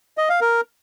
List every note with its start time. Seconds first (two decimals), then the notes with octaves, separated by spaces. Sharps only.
0.18 D#5
0.29 F5
0.41 A#4